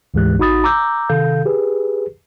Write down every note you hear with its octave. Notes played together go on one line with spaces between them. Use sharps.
D2 G#2 E3 G#3 G4 F#6
A1 D#4 F#4 B5 D#6 A6
A#5 D6 E6 G6
C3 D#3 A4 F5 G6
G4 G#4 B4